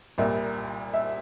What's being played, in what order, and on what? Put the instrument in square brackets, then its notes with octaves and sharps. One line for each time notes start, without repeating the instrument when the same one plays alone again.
[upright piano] C2 A#2 G3 A#3 E5
E5